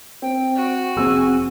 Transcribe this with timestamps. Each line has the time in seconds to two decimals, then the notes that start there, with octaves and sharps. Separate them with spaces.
0.22 C4 G5
0.56 F#4
0.97 F1 A2 C4 G#4 G#5 E6